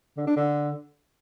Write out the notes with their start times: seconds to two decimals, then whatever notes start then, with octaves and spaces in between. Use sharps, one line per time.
0.17 D3
0.27 D4
0.36 D3